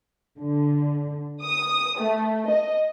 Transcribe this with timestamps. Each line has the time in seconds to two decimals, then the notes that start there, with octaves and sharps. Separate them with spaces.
0.39 D3
1.43 D#6
2.00 A3
2.48 D#5